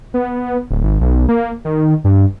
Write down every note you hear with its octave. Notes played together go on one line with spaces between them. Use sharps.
B3
D1
G#1
B1
A#3
D#3
G2